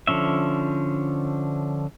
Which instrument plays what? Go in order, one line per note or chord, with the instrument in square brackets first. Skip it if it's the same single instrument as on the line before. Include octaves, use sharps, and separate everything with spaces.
[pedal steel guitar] D3 F3 C#4 E5